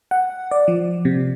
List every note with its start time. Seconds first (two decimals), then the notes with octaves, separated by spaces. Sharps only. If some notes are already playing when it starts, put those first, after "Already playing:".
0.11 F#5
0.51 D5
0.68 F3
1.05 C3